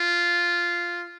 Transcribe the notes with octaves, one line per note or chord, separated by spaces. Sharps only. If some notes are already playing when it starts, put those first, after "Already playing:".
Already playing: F4